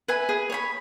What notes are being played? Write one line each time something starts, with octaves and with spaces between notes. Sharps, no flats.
B4 E5 G#5
G#4
C#5 G#5 B5